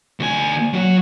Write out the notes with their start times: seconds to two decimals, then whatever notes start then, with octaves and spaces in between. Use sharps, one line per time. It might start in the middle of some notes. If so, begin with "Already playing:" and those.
0.20 D2 G#5
0.73 F#3 F#4